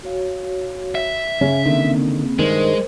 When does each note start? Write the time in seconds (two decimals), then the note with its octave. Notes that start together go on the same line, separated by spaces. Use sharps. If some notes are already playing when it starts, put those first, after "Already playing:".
0.03 F#4 C#5 F5
0.95 E5
1.41 C#3 C#4
1.66 D3 D#3 A#3 C4
2.39 G2 D#3 G#3 A#4 C5